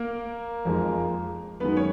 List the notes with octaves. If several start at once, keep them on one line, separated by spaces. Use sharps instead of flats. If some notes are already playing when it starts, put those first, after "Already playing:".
Already playing: A#3 A#4
F2 F3 G#3
F#2 D#3 G#3 B3 B4
C#5